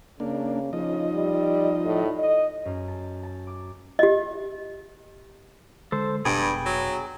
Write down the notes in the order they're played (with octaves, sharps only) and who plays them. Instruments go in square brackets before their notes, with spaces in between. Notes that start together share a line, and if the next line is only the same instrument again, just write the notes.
[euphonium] C#3 [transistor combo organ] A#3 D4
[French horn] C#3 [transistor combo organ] F3 D#5 [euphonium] D#4
[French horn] G3
A2
D#5
[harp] F#2
A5
A5
D6
[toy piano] G4 D#5
[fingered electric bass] D3 G#3 [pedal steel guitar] A4 C5
[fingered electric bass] F1 B2 [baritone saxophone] G2 [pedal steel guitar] G#4 G5 B5
[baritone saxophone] F#3